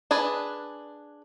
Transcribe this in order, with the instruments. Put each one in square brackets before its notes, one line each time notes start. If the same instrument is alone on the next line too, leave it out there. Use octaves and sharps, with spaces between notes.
[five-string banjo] D4 G#4 B4